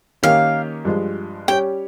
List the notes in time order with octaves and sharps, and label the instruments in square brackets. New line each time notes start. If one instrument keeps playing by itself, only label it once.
[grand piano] D#3 A#3 C#4 G4 [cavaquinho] F5
[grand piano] G2 F3 G#3
[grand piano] G3 C#4 G4 C#5 [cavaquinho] G5